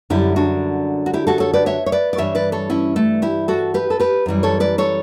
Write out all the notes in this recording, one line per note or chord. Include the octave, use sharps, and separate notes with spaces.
F#2 D3 G3 E4 G4
D4 F#4
F#4
E4 G4
F#4 A4
A4 C#5
B4 D5
C#5 E5
C#5
B4 D5
D5
G2 E3 G3 C#5 E5
B4 D5
A4 C#5
C#4 E4
A3
E4 G4
F#4 A4
G4 B4
A4
G4 B4
F#2 E3 G3
A4 C#5
B4 D5
A4 C#5